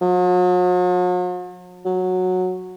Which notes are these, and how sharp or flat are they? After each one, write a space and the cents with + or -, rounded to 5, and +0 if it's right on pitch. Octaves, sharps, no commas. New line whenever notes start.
F#3 -45
F#3 -10